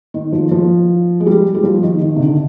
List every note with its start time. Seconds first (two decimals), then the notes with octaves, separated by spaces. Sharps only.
0.14 D#3
0.33 F3
0.51 F3
1.20 G#3
1.26 G3
1.55 G3
1.63 F3
1.83 D#3
2.02 D#3
2.16 C3
2.20 D3